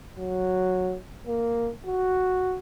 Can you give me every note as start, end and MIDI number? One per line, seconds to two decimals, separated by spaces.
0.17 0.97 54
1.27 1.70 58
1.86 2.59 66